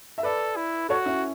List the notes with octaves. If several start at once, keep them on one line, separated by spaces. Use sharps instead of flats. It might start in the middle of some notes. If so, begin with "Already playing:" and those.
E5
A4 B4 D5
E4
F#4 A4 C#5
C#4 E4